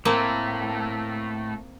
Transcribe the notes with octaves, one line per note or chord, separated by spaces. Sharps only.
A2 A3 A#3 C4